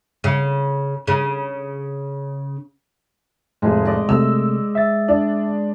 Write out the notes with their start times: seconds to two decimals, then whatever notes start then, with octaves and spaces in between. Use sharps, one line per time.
0.24 C#3
1.07 C#3
3.62 F1 A2 G#3 G#4
3.85 D5 D#5
4.09 C3 A3 E6
4.75 E5 A6
5.08 D4